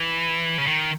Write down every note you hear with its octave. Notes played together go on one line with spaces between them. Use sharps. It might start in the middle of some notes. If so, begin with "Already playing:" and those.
Already playing: E3
C#3
D#3